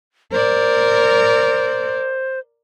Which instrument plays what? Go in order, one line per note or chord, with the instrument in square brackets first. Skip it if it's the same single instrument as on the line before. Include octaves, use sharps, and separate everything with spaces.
[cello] A#4 D5 [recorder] C5